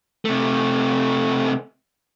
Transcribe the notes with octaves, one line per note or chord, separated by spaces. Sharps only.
C3 A3